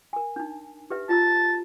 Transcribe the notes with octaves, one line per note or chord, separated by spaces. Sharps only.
A#4 G#5
D4 D#4
G4 B4 E5
F4 A5 A#5 E6